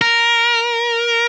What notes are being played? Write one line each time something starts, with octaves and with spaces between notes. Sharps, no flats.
A#4